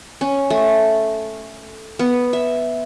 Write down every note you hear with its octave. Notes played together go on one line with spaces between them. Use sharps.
C#4
A3
B3
E5